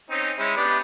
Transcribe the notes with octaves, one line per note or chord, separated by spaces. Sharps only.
C4 C#4 D#4
G#3 C#4 E4
B3 D4 G4